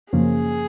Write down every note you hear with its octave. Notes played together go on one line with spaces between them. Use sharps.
F#2 C#3 F3 A#3 G#4